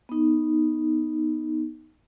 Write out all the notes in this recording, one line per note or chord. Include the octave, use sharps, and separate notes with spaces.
B3 D#4